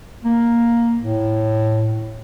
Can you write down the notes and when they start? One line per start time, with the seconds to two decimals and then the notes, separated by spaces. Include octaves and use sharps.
0.25 A#3
0.99 A2